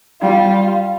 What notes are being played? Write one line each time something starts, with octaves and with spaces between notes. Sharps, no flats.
G3 F4